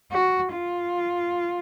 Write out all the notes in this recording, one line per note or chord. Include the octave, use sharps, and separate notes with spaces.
F#4
F4